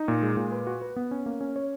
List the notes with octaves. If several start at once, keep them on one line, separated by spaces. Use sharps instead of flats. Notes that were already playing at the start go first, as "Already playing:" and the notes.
Already playing: D#4
A#2
G#3
A#2
B4
F#4
B4
B3
C#4
A#3
C#4
C#5